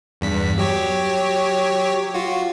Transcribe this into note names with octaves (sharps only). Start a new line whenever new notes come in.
E2 G2 B6
F#3 G4 C#5
F4 F#4